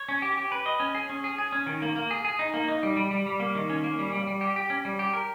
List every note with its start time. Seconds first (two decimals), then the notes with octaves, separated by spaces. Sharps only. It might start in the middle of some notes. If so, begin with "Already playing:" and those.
Already playing: C#5
0.09 C#4
0.22 G4
0.38 G4
0.52 B4
0.66 D#5
0.80 C#4
0.95 G#4
1.10 C#4
1.24 G#4
1.38 G#4
1.52 C#4
1.66 D#3
1.82 A#3
1.96 A#3
2.11 G#4
2.25 G#4
2.39 D#4
2.54 A#3
2.68 D#4
2.83 G3
2.97 G3
3.11 G3
3.26 G3
3.40 A#3
3.55 D#3
3.70 C#4
3.84 A#3
3.99 G3
4.13 G3
4.27 G3
4.41 G4
4.56 G4
4.70 C#4
4.85 G3
4.99 G4
5.14 A#4